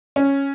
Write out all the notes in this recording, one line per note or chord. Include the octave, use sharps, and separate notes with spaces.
C#4